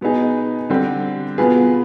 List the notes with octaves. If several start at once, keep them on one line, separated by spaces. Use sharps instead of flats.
B2 B3 D#4 G#4
D3 G3 C4 G4
B2 B3 F4 G#4 B4